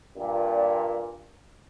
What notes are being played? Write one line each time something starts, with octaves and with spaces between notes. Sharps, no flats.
G2 A#2